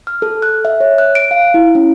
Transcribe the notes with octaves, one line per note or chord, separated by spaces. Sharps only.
F6
A4
F#6
E5
C#5
F#6
D7
F5
E4
C#4